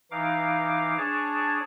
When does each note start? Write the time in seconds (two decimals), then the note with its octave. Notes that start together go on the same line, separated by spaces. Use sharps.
0.11 E3 D#4 F5 D6
0.98 D4 G#4 C#5 A5